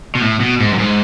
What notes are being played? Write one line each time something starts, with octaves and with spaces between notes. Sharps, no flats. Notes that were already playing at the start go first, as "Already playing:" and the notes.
B2
A2
B2
G#2
F#2
G#2